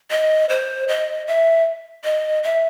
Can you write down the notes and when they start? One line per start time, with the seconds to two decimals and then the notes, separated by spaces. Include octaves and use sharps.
0.11 D#5
0.49 C5
0.88 D#5
1.27 E5
2.04 D#5
2.44 E5